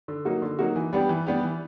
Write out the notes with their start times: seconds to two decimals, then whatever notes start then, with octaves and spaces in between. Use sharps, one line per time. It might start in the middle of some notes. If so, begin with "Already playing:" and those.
0.08 D3
0.25 F#3 A#3 D#4 F#4
0.42 D3
0.59 F#3 A#3 D#4 F#4
0.76 E3
0.93 G3 B3 D4 G4
1.09 E3
1.27 G3 B3 D4 G4
1.43 E3